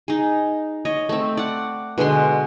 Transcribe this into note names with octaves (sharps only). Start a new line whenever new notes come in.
D#4 G#4
C#5 D#5
A3 C4
D5 F#5
B2 D3 G#3 C6